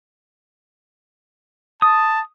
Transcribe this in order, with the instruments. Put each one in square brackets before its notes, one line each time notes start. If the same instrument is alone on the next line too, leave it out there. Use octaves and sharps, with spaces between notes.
[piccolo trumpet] A5 [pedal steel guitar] D#6